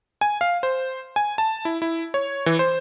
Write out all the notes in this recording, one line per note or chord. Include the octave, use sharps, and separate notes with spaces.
G#5
F5
C5
G#5
A5
E4
E4
C#5
E3
C5